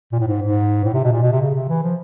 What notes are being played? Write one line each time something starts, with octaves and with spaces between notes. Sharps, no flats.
A#2
A2
G#2
G#2
A2
C3
B2
A#2
B2
C3
C#3
C3
E3
F3